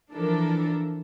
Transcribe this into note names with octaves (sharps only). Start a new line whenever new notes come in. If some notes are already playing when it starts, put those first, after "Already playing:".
E3 F3 D4 A4 A#4